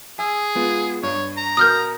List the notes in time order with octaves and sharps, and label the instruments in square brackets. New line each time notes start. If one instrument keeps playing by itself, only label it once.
[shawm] G#4 [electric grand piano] G#5 E6
[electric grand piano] G#3 B3 F4
[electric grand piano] G2 [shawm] C#5
[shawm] A#5
[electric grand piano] B2 F#4 A#4 [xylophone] D#6 F6 G6